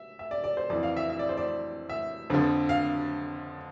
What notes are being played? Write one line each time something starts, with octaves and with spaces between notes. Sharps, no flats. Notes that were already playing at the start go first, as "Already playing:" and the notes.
Already playing: E5
E5
D5
D5
C5
F2 E3 D5
F5
E5
E5
D5
C5
D5
E5
F2 D3 F3
F5